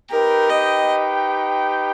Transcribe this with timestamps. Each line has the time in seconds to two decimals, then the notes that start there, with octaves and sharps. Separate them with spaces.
0.11 D#4 G4 A#4 B4 G5
0.49 D#5